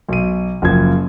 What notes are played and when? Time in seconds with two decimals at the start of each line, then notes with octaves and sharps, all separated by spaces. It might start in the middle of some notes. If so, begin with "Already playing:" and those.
0.09 B1 D#7
0.62 F#1 F3 G#6